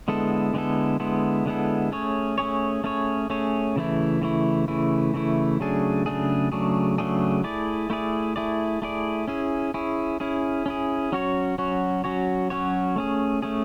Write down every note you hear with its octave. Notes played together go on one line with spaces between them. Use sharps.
D3 G#3 B3 E4 A4
D3 G#3 B3 E4 A4
D3 G#3 B3 E4 A4
D3 G#3 B3 E4 A4
A3 C#4 G#4 C#5
A3 C#4 G#4 C#5
A3 C#4 G#4 C#5
A3 C#4 G#4 C#5
C#3 E3 A3 E4
C#3 E3 A3 E4
C#3 E3 A3 E4
C#3 E3 A3 E4
C#3 F#3 A3 D4 G#4
C#3 F#3 A3 D4 G#4
C#3 F#3 A3 D4 G#4
C#3 F#3 A3 D4 G#4
A3 E4 G#4 D5
A3 E4 G#4 D5
A3 E4 G#4 D5
A3 E4 G#4 D5
C#4 E4 G#4
C#4 E4 G#4
C#4 E4 G#4
C#4 E4 G#4
F#3 C#4 F#4 C#5
F#3 C#4 F#4 C#5
F#3 C#4 F#4 C#5
F#3 C#4 F#4 C#5
A3 C#4 G#4
A3 C#4 G#4